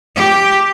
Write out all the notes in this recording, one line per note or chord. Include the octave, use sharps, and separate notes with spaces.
G4